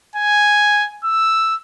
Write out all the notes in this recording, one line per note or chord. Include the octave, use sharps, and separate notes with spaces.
G#5
E6